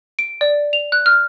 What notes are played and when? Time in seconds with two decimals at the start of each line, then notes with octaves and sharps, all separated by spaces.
0.19 D7
0.41 D5
0.73 F7
0.92 F#6
1.06 F6